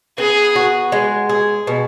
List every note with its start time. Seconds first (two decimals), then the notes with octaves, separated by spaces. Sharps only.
0.18 B3 G#4
0.56 F#4
0.92 G#3
1.29 G#4
1.67 B2